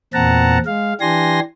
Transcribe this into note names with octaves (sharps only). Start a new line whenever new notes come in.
E2 A#2 C4 F#5 A5 A#5
G#3 F5
E3 D4 G4 G#5 C6 A#6